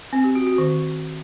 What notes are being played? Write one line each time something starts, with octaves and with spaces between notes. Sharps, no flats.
C4
G4
F#4
F#4
D#3